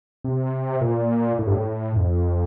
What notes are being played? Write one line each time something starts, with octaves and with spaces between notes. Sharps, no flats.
C3
A#2
A2
G2
A2
F2